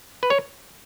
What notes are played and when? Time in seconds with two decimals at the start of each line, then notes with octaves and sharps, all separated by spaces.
0.23 B4
0.30 C#5